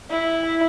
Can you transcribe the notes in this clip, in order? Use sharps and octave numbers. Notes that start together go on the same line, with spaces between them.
E4